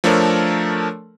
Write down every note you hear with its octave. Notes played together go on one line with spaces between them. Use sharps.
F3 A3 D4 A4 A#4 C#5